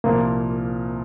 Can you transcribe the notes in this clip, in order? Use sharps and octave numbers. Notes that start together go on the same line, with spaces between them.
C2 A#2 F3 A#3 C4